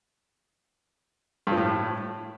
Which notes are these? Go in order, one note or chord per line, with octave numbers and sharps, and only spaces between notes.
G2
F3
A2